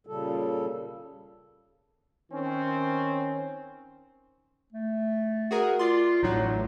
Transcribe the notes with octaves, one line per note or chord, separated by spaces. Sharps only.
A#2 C#3 G3 A4
D#3 C4 C#4
A3
F#4 G#4 A#4
F4 D5 C6
A1 A2 F#3 D#4